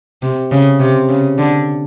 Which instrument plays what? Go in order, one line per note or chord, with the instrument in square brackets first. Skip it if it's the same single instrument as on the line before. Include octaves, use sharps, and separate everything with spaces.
[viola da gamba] C3
C#3
C3
C#3
D3